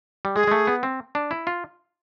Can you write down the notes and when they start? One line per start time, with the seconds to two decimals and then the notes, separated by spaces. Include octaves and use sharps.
0.25 G3
0.36 G#3 G#4
0.47 G#3
0.51 A3
0.67 B3
0.83 C4
1.15 D4
1.31 E4
1.47 F4